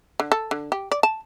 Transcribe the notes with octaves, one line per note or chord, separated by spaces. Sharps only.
D3
A4
D3
G4
D5
A5